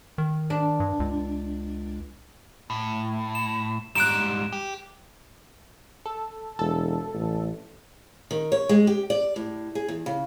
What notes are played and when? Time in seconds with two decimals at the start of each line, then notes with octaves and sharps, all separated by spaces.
0.18 D#3
0.50 D4
0.80 G2
1.00 C#2
2.70 A2
3.35 E7
3.95 G#2 G3 F#6 D7 E7
4.52 G4
6.06 A4
6.59 E1 A4
7.14 A1
8.31 D#3
8.52 C#5
8.69 G#3
8.87 G4
9.10 D5
9.36 A2
9.75 G#4
9.88 E2
10.06 C#3